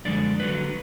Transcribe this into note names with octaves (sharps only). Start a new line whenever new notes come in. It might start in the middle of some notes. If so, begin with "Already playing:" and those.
F#2 D3 F3 G#3 D5
D#2 D3 F#3 B4